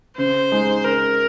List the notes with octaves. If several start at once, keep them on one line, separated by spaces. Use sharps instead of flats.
C#3 C5
G#3 D#4
C#3 A#4